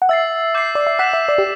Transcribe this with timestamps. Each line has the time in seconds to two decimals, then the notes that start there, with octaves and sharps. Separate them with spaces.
0.02 F#5
0.09 E5 E6 A6 C7
0.54 D6 G6 C7
0.75 D5
0.87 E5
0.99 F#5 E6 B6 E7
1.13 E5
1.29 D5
1.38 G4